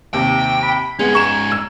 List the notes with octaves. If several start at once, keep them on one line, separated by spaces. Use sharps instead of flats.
D#2 C3 G5
B5
G#2 G#3 B3 C#4 G#5
A#5 C#6 E7
E6